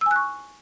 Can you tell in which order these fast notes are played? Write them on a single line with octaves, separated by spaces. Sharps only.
E6 G#5 F#6 C#6